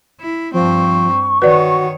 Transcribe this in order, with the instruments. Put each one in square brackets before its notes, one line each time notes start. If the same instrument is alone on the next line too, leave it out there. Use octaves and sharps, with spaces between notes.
[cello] E4
[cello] G2 C4 [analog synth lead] F3 [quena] C#6
[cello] D#3 C#5 [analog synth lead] F#4 [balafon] B4 D5